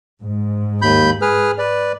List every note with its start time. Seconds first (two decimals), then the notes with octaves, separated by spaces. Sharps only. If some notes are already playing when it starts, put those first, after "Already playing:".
0.22 G#2
0.82 D#2 B5 G6
1.22 G#4 B4 F6
1.58 B4 D5